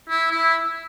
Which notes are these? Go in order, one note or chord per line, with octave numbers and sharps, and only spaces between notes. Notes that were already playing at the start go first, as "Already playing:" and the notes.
E4
E4